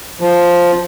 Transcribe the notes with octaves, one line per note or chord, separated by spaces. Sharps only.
F3